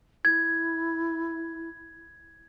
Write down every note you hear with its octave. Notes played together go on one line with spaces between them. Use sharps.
E4 G#6